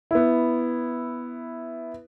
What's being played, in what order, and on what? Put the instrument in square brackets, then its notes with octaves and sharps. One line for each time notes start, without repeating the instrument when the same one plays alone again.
[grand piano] B3 E4